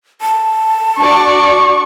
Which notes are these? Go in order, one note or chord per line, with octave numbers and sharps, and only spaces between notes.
A5
D4 F#4 D5 C#6